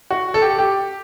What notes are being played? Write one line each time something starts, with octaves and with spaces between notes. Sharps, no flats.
F#4
A4
G4
G4